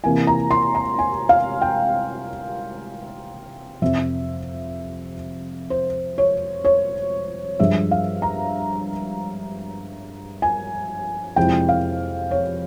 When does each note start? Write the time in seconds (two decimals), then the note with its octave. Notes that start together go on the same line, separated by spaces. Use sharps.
0.04 C3 E3 A#3 E4 G#5
0.27 A#5
0.51 C6
0.75 A#5
0.99 G#5
1.29 F5
1.62 G5
3.82 F2 C3 F3 E5
5.70 C5
6.18 C#5
6.65 C#5
7.60 G2 F3 G#3 E5
7.91 F5
8.22 A#5
10.42 G#5
11.36 F2 C3 F3 G#3 E4 G5
11.69 F5
12.31 C#5